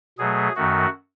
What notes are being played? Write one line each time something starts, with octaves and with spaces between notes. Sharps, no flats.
B2 F#3 A3 G#4
F#2 D#3 A3 F#4